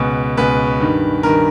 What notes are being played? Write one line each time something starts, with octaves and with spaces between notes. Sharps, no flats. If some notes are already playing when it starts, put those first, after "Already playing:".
Already playing: C#2 B2 B4
C#2 B2 B4
G2 D#3
G2 D#3 A#4